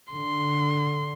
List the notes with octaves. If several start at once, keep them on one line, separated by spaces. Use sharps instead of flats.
D3 C6